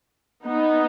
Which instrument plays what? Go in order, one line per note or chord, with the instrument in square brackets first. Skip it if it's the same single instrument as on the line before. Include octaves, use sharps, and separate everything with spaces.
[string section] B3 D#4